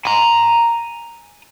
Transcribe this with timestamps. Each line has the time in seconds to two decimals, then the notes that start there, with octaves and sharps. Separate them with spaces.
0.05 G#5 A#5